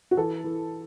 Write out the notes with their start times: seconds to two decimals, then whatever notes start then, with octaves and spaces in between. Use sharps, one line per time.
0.11 F#4
0.17 E3 A4
0.44 E3